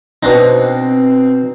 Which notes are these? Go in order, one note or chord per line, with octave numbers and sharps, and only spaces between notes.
B2 C4 D4 D#4